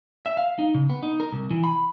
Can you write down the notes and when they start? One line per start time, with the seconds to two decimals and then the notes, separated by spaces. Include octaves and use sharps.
0.26 E5
0.37 F5
0.59 D#4
0.74 C#3
0.90 B3
1.03 D#4
1.20 A#4
1.32 C2
1.51 E3
1.64 B5